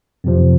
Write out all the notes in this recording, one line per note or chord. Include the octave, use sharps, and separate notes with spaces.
F2 C3 F3